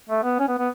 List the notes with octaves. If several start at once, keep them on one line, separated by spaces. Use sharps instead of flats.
A3
B3
C#4
B3
B3